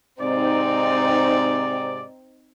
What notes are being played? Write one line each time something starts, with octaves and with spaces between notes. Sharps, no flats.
G#2 C3 C4 D#4 D5